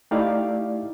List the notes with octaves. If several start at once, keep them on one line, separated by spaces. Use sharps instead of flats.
A3 D#4 E4 G4 D5 F5